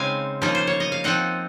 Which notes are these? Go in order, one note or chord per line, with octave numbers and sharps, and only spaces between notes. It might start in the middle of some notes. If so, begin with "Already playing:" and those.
Already playing: C#3 G#3 C4 D#4 F5 G#5
C#3 F3 A#3 D#4
C5
C#5
D#5
F5
F3 C4 D#4 D#5 F#5